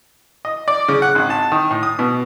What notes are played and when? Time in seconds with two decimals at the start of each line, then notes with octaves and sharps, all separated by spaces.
0.45 D#5
0.68 D5
0.88 C#3
1.02 F#5
1.15 G#1
1.30 A5
1.52 D#3
1.71 A2
1.83 D#6
1.99 B2